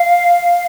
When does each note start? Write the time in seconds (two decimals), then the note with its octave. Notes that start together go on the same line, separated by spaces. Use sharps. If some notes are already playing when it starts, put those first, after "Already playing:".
Already playing: F5